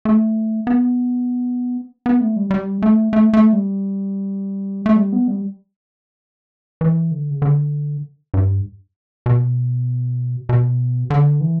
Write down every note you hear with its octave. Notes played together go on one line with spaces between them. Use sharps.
A3
B3
B3
A3
G3
G3
A3
A3
A3
G3
A3
G3
B3
G3
E3
D3
C#3
D3
G2
B2
B2
D3
E3